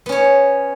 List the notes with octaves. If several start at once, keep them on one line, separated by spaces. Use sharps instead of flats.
B3 C#4 C#5